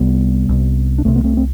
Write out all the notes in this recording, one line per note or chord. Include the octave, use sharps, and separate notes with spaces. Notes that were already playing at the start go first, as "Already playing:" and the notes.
Already playing: C2 C3 G3 B3
C2 C3
D4
C2 C3 A3 C4
B3
A3 C4
C4